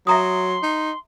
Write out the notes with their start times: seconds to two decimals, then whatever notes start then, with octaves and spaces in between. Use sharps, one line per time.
0.07 F#3 E5 A#5 C6 D#6
0.63 D#4